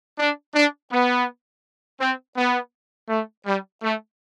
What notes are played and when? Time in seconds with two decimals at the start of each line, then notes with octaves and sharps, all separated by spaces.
0.18 D4
0.55 D4
0.92 B3
2.00 C4
2.36 B3
3.09 A3
3.46 G3
3.82 A3